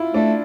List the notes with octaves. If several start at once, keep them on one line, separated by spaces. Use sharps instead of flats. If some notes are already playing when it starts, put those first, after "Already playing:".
Already playing: E4 F4
A3 D4